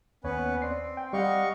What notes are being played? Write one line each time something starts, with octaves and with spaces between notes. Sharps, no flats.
D#2 B3 C#4 B4 C#5
C4 D5 C7
G5
G3 D#5 F5 F#5 C#6